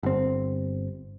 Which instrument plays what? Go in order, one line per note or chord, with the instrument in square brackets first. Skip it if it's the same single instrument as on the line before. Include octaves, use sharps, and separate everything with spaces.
[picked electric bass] G1 C4